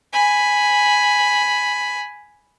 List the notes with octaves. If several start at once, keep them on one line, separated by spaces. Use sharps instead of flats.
G#5 B5